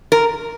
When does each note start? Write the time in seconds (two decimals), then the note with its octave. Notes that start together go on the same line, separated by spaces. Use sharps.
0.12 A#4